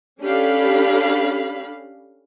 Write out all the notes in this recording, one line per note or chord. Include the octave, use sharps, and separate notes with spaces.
C#4 D4 G4 A4 F5 B5